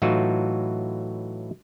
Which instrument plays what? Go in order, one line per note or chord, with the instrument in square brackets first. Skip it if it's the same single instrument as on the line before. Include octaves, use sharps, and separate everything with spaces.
[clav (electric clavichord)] A2 E3 F#3 D#4 F4 F#4